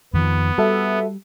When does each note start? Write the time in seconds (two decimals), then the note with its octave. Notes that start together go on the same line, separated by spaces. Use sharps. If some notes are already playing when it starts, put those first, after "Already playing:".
0.13 F2 D#3 F3 B3
0.58 G3 F#4 A4 E5